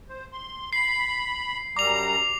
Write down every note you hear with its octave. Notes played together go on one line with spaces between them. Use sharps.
C5
C6
B5 C7
F#2 G3 A#5 D6 F7